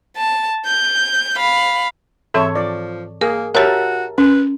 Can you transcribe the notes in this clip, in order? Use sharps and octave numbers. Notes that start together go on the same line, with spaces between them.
A5
G6
F5 B5
G#2 E3 C4 A4 C#5 E5
F3 D5
A#3 G#4 A#4
F#4 G4 A#4 C#5 E5 A5
C#4 B4